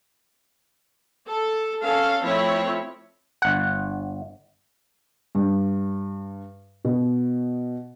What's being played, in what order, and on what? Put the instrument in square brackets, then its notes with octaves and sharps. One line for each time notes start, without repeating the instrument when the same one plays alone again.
[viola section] A4
C#4 A4 F5
F3 A3 C4 E4 C#5
[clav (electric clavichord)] G1 F#5
[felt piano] G2
B2